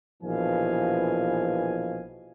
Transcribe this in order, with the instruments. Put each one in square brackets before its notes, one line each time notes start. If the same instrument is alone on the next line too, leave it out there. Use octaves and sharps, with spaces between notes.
[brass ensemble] A#1 B2 E3 F3 F5 G#5